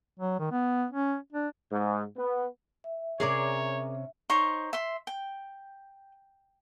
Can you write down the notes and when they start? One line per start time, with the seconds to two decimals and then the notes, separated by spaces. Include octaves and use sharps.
0.19 F#3
0.40 D#3
0.52 B3
0.91 C#4
1.33 D4
1.71 G#2
2.17 B3
2.84 E5
3.20 C3 C#4 G#4 A#4 C#5 D5
4.30 D#4 C5 C#5 C#6
4.73 E5 C6
5.07 G5